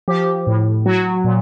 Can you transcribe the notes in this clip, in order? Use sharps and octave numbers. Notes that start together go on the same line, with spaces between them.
F3 G4
A2
F#3 F#4
A#2